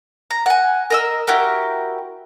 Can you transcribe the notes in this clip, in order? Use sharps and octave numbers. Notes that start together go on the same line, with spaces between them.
A#5
F#5 G#5
A#4 D#5 E6
E4 F#4 G4 A#4